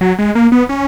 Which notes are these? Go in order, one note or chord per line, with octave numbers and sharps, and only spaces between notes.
F#3
G#3
A#3
B3
C#4